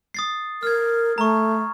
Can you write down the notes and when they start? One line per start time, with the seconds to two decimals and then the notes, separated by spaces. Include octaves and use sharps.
0.14 D#6 A6 C7
0.63 A#4 F6 G#6
1.18 A3 A#5 C#6